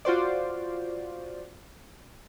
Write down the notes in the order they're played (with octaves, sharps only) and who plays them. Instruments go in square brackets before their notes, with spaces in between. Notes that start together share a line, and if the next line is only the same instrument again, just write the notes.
[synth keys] F4 F#4 C5 D5